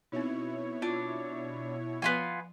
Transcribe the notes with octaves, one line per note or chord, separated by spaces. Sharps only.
B2 C4 D#4 E4 C#5
D4 F4
F3 B3 F4 G#5